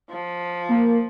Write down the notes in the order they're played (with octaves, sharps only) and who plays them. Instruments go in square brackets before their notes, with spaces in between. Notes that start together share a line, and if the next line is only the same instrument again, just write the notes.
[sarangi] F3
[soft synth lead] A#3